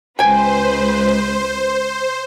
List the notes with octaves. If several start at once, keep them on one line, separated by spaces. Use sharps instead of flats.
C#2 B4 C5 G5 G#5